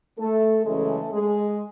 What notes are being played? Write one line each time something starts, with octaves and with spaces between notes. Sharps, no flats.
A3 A4
F#2 C#3 E3 G#3 A3 A4
G#3 G#4